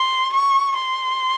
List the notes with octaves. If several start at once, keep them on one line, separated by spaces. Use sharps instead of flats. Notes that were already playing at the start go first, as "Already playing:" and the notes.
Already playing: C6
C#6
C6